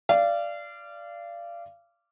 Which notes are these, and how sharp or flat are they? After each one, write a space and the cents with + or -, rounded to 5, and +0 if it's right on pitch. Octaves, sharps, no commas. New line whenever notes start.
D5 -5 F5 -30